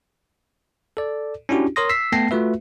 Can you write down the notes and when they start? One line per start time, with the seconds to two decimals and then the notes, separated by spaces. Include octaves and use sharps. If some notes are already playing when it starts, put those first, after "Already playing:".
0.97 A4 D5
1.49 C#4 D4 E4 F#4 G4
1.76 A#4 C#5 C6 D#6 A#6
1.89 E6 B6 C7
2.12 A3 B3 G5 A5 A#6 C7
2.31 A3 F4 F#4 B4 E5